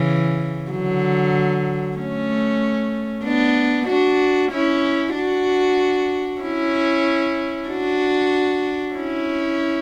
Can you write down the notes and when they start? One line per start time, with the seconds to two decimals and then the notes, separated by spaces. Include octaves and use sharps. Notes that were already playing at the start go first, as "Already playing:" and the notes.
Already playing: C#3 E3
0.71 D3 F#3
1.97 A3 C#4
3.25 B3 D4
3.87 D4 F#4
4.52 C#4 E4
5.14 D4 F#4
6.41 C#4 E4
7.68 D4 F#4
8.94 C#4 E4